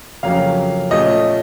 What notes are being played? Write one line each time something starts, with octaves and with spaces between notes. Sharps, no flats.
F2 C#3 F#3 A#3 C#4 F5
A#2 A3 C#4 D#5